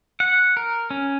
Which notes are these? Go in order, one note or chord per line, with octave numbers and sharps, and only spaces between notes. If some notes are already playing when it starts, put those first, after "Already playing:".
F#5
A#4
C#4